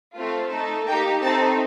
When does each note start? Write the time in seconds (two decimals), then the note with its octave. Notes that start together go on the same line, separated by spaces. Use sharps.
0.14 A3 C4 F4
0.50 A3 D#4 A4
0.86 A#3 D#4 G4 G5
1.21 A3 C4 D#4 A4 A5